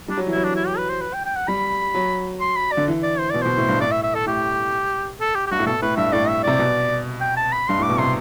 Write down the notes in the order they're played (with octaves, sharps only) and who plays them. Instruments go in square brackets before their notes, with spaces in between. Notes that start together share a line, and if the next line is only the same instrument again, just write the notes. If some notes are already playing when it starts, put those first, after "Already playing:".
[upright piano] G3 [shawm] D4
[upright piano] F#3
E3
[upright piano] F#3 [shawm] E4
[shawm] D4
E4
G4
B4
C5
B4
G5
G5
F#5
[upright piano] G3 [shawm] B5
[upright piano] F#3
[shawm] C6
B5
D5
[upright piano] D3
E3
[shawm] D5
C5
[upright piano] B2 [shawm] D5
[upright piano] B2 [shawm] C5
[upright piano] A2
G2
[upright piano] A2 [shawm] D5
[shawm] E5
E5
A4
[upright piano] A2 [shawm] G4
[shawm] A4
G4
G4
[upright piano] G2 [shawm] F#4
[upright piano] A2
[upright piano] B2 [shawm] A4
[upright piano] A2 [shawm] B4
[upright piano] G2 [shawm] E5
[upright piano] A2 [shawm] D5
[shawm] E5
[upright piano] C3 [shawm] D5
[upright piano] B2
[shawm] G5
A5
B5
[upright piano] G2 [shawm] C6
[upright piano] A2 [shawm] D6
[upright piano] B2
[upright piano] C3 [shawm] C6